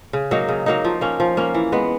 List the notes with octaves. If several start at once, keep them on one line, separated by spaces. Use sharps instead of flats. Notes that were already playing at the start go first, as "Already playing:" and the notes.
C#3
F#3 A#3 D#4
C#3
F#3 A#3 D#4
F3
A#3 C#4
F3
A#3 C#4
E3
G#3 B3